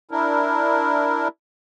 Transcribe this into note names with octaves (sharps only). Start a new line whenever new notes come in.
D4 E4 A#4